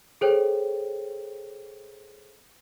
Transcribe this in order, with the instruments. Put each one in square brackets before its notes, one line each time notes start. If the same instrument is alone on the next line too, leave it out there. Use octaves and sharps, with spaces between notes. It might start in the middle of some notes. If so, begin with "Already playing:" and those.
[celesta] G#4 A4 C5 C#5 G5